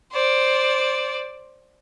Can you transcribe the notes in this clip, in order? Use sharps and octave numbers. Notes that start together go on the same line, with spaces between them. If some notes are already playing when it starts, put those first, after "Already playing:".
C5 D5